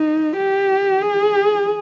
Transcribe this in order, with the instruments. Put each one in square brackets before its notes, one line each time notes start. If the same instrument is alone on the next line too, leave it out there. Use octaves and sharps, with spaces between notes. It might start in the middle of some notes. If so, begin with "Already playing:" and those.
Already playing: [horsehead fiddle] D#4
G4
G#4